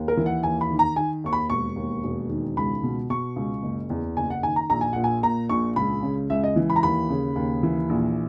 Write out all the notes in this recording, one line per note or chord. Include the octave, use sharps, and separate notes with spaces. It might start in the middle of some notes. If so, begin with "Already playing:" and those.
Already playing: D#2
A#4
E3
F#5
D#2 G#5
B5
D#3
A#5
D#3 G#5
D#2 C#6
B5
E1 C#6
D#2
E1
D#3
C#2 B5
B2
B2 C#6
C#2
F#1
E2
F#1 G#5
F#5
D#3 G#5
A#5
A#1 A#5
G#5
A#2 F#5
G#5
A#2 A#5
A#1 C#6
C#2 B5
C#3
C#2 E5
D#5
E3
B5
A#5
D#2 B5
C#3
D#2
E3
A#1